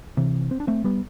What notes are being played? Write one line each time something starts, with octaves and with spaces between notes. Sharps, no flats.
C3 E3
C4
D4
A3 C4
G3 B3